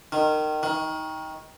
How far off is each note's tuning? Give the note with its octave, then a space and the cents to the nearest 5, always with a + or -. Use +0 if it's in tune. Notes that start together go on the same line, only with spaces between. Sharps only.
D#3 -20
D#3 +20